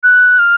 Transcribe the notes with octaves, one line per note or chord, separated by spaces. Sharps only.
F#6
F6